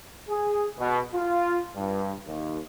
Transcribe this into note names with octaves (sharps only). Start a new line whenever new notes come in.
G#4
B2
F4
G2
D#2